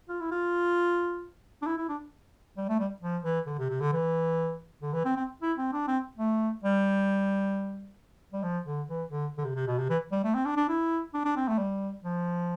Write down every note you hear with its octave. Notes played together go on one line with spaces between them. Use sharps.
F4
E4
F4
D4
E4
E4
D4
G3
A3
G3
F3
E3
D3
C3
C3
D3
E3
D3
E3
C4
C4
E4
C4
D4
C4
A3
G3
G3
F3
D3
E3
D3
D3
C3
C3
B2
C3
E3
G3
A3
C4
D4
D4
E4
D4
D4
C4
A3
G3
F3